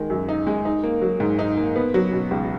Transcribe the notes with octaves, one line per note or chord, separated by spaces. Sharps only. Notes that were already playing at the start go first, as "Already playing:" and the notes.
Already playing: D#3 G#3
F#2
D#4
G#3
D#4
A#3
F#3
G#2
D#4
A#3
B3
F#3
B2
C#2